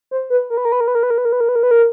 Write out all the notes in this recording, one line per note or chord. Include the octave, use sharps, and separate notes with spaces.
C5
B4
A#4
B4
A#4
B4
A#4
B4
A#4
B4
A#4
B4
A#4
B4
A#4
B4
A#4
B4
A#4